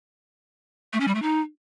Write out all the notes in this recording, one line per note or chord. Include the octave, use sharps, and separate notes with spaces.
A3
C#4
G3
A3
D#4